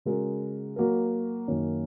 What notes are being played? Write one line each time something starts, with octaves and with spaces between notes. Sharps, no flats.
C#3 G#3 F#4 A#4
F#3 A#3 F#4 A#4
F#2 D#3 F#3 A#3 C#4